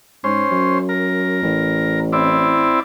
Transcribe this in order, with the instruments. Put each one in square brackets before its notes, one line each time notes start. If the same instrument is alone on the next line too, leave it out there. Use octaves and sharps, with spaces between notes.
[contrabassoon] G#2 [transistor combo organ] C#4 C5
[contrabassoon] F#2
[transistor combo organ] A#4
[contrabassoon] A1
[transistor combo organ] C4 E4 D5